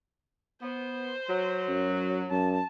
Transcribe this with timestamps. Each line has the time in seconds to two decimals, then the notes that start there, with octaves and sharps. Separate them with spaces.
0.62 B3 C5
1.29 F#3
1.68 F#2
2.31 F#2 A5